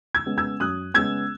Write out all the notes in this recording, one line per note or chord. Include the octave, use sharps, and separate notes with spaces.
E6 G#6
C#3 G#3 B3
E6 G#6
F#2 D#6 F#6
C#3 G#3 B3 E6 G#6